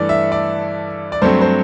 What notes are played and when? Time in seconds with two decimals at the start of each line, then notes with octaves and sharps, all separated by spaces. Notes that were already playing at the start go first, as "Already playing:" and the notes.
Already playing: G2 E3 A3 A4 D5
0.09 E5
0.32 D5
1.12 D5
1.22 G2 F#3 A3 C4 C5
1.41 C5